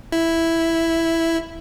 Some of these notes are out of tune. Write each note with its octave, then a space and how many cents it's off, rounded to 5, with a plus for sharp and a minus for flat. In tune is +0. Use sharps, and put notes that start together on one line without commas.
E4 +0